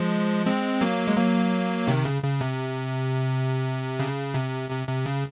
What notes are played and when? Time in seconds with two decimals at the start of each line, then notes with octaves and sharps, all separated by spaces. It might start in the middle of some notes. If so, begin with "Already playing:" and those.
Already playing: F3 G#3
0.47 G#3 C4
0.81 F#3 A#3
1.07 G#3
1.16 F#3 A#3
1.87 C3 D#3
2.05 C#3
2.23 C#3
2.41 C3
3.99 C#3
4.34 C3
4.70 C3
4.87 C3
5.06 C#3